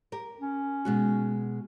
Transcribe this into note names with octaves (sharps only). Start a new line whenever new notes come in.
G4 A#4
C#4
B2 G#3 F#4